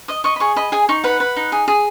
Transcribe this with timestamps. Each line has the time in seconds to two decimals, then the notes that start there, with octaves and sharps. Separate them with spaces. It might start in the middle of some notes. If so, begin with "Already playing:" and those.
0.08 D#5 D#6
0.24 D#5 C#6
0.36 B5
0.40 G#4 C#6
0.56 D#5 B5
0.72 G#4 G#5
0.89 D#4 C#6
1.04 B4 F#5
1.20 B4
1.36 D#4
1.52 G#4
1.68 G#4